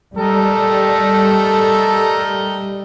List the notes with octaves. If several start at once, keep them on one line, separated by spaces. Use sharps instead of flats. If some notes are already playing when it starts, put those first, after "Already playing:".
G3 A3 D#4 A4 A#4